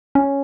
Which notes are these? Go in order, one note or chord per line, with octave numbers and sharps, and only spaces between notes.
C#4